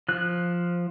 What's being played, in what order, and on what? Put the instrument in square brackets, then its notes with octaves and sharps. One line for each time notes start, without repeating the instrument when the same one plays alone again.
[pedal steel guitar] F3 F#6